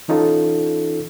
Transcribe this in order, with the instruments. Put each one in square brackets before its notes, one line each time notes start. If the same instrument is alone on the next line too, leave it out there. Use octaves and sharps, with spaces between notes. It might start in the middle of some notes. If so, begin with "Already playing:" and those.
[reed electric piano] E3 C#4 D#4 F4 A4